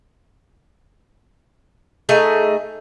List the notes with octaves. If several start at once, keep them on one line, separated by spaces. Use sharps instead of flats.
A3 D#4 G#4 E5